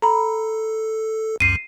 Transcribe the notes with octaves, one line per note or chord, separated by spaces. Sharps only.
A4 A#5 B5
C#2 F#2 C7 D#7